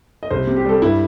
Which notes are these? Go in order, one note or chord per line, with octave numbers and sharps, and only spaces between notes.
D#5
C2 C5
C3
G4
G3 A4
G2 E4